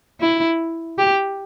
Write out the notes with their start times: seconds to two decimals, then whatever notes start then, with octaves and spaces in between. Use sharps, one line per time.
0.20 E4
0.98 G4